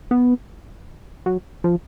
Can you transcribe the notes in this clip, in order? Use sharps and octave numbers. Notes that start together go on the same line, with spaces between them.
B3
F#3
F3